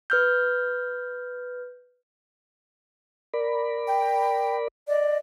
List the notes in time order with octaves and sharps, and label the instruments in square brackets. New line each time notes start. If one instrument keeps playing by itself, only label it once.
[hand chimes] B4 F6 G6
[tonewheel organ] A#4 D5 B5
[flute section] G5
D5 D#5